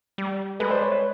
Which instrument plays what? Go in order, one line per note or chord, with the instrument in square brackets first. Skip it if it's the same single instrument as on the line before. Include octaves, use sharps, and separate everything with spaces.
[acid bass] G3
[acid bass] G#3 [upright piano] A4 B4
[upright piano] C5 D5
B4 C#5
B4 C#5